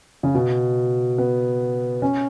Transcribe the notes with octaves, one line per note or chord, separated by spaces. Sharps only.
C#3
B2
B3
C#4